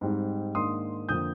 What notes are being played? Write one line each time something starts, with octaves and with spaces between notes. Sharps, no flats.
G#2 G3 C4 D#4
G#2 D#3 A#3 D4 C6 D#6
F2 D3 F3 A#3 D#6 G6